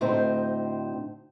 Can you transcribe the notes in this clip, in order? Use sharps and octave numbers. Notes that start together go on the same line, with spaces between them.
D2 A2 C4 D#4 C5